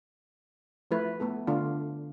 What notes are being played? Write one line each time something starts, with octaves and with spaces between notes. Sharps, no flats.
F3 A3 E4 B4
A3 B3 A4
D3 A3 D4 F4